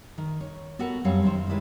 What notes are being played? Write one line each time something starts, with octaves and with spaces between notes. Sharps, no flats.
D#3
C#5
B3 F#4 A4 A#4 F#5
F#2 G3 C4 A4 C#5 F5
F#2 D#3 C#4 C5
D#3 G3 G#3 E4 B4